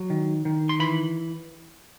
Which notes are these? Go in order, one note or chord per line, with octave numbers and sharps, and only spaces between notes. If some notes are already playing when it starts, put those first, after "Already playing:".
Already playing: F#3
D#3
D#3
C6
E3 B5